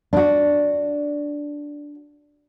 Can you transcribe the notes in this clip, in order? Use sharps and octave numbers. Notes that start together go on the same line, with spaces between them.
D4 F#4